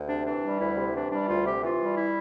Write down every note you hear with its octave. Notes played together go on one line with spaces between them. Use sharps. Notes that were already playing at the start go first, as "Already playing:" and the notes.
Already playing: D2
C3 D4
E3 D4
G3
D2 E4
C3
E3 D4
G3 D4
D2 F4
C3 G4
E3 F4
G3
E4